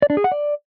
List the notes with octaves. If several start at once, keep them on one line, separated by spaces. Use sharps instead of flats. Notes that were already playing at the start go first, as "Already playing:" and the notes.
D5
D4
G#4
F#5
D5